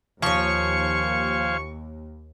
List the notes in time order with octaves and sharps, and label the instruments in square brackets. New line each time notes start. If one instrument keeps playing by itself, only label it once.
[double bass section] D#2 [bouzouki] F3 C#5 [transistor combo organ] C5 F5 G#5 [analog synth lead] C#6